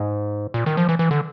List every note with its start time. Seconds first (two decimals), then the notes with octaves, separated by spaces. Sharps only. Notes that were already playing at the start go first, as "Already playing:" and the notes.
Already playing: G#2
0.54 A#2
0.66 D#3
0.77 F3
0.89 E3
0.99 E3
1.11 D3